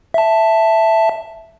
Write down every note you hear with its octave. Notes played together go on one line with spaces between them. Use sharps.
E5 A5